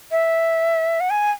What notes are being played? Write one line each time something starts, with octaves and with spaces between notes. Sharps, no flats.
E5
F#5
G#5